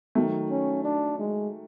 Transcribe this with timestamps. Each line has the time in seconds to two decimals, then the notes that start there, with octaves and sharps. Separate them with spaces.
0.15 D#3 F#3 A3
0.50 C#4
0.84 D4
1.19 G#3